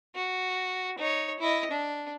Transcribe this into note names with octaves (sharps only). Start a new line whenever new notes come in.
F#4
D#4 C#5
E4 D#5
D4